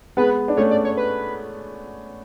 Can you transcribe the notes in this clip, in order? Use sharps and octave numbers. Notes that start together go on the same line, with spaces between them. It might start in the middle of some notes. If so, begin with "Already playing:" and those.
G#3 B3 B4
D4
A3 C#4 C#5
D5
C#5
B4